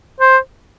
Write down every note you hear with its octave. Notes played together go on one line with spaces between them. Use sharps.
C5